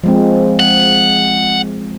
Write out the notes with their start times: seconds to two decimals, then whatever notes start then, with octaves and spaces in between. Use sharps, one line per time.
0.04 F3 G#3 C4
0.60 F#5